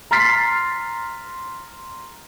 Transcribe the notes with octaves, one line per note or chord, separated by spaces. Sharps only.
A#5 C6 F6 A6 B6 C7